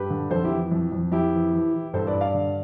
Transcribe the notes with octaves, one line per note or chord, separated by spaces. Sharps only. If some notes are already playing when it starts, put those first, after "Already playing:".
Already playing: G2 G4 B4
D3
F2 A4 C5
E4 G4
E3
F2
F2
F2 E4 G4
E3
E3
E3
G2 A4 C5
B4 D5
G2
D5 F5
D3